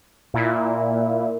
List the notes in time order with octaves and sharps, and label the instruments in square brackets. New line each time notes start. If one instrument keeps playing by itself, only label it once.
[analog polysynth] A#2 E4